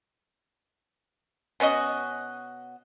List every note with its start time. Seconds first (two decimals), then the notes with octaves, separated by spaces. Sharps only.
1.60 B2 C#4 F#4 D#5